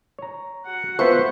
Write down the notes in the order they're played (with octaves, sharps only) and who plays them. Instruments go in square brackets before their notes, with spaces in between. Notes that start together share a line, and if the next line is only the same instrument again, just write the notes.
[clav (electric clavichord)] C#5 A#5
[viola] F#4 F#5
[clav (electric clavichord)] B3 F4 E5 [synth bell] B4 C#6 [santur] C5